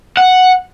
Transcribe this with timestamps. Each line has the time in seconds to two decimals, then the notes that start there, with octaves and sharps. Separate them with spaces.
0.17 F#5